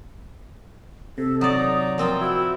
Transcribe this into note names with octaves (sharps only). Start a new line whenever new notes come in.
C3 A4
F#3 D#4 D5 D#6
F3 C4 A#4 G5
E4 F#4